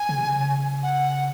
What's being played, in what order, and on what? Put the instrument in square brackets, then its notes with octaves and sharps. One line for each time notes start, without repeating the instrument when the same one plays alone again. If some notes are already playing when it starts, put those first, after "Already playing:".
Already playing: [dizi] G#5
[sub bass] C#3
C3
C#3
[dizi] F#5